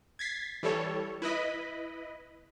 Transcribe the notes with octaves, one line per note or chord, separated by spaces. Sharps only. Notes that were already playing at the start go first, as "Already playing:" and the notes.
G#6 A6 B6 C7
E3 G3 A4 C#5
E4 B4 D#5 B5